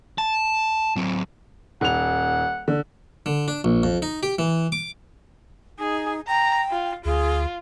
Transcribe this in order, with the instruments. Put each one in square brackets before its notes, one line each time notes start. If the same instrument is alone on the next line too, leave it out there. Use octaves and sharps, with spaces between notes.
[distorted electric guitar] A5
F#3 C4
[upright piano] D#1 F7 [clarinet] F#5
[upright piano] D3
[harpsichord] D3
D4
A#1
F2
D#4
G4
E3
D6
[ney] D#4 [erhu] G#4
[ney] G5 [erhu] A#5
[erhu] F4
[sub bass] D2 [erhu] F4 [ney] G#4